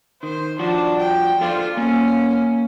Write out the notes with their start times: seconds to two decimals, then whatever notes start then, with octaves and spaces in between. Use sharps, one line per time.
0.23 D#3 C5
0.59 F3 D4 F#4
0.99 G5
1.41 F4 A4 C5 D5
1.77 A#3 C#4